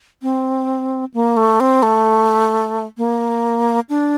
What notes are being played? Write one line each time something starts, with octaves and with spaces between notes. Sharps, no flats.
C4
A#3
A3
C4
A3
A#3
D4